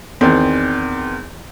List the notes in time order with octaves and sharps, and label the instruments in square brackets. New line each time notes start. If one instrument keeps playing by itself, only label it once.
[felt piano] E2 D#3 C4